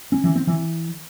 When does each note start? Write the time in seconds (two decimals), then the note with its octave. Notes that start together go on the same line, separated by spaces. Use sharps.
0.12 C#4
0.24 E3
0.35 C4
0.47 E3